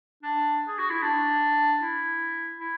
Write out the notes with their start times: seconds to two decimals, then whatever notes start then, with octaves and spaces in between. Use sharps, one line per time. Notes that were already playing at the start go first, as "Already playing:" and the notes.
0.23 D4
0.68 G#4
0.79 F#4
0.90 E4
1.03 D4
1.81 E4
2.60 E4